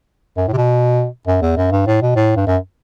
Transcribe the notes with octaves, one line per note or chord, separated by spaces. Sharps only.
F#2
A2
C3
B2
F#2
E2
F#2
G2
A2
B2
A2
G2
F#2